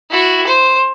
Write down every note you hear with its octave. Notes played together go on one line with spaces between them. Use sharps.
E4 F#4
C5